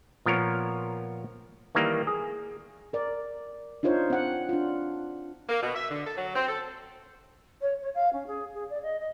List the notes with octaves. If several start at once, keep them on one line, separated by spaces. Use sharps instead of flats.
A#2 F3 B3 A#4 C#5
D#3 E3 G3 A#3
G#4
A#4 D5
D4 D#4 F4 C5 C#5
C4 F#5
D4 F4
A#3
B2
E5
D3
A4
F#3
C4
A4
C#5
C#5
F5
C#4
G#4
G#4
D5
D#5
D#5